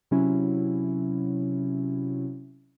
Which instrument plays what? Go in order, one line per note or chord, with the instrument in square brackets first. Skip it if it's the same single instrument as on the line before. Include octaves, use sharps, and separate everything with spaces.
[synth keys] C3 F#3 C#4 E4 F#4